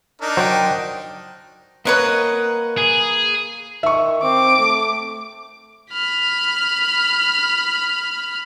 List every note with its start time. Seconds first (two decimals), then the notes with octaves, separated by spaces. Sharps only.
0.21 D4 D#4 A#4
0.37 F#3 C5 D5 G5
1.85 A#3 B4 C#5 D#5 F#5
2.78 G#4
3.83 D#3 E5 C#6
4.23 C4 D6
4.58 A3
5.92 B5 F6